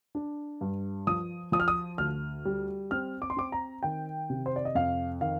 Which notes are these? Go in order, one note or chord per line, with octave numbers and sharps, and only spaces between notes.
D4
G2
F3 D#6
F3 D#6
F6
D#6
D2 F6
G3
C4 F6
D6
C6
C4 D6
A#5
D#3 G5
C3
C5
D5
D#5
F2 F5
D#3 F5